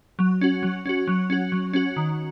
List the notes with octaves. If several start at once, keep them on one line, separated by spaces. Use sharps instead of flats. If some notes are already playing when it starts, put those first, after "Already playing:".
F#3
C#4 F#4
F#3
C#4 F#4
F#3
C#4 F#4
F#3
C#4 F#4
D#3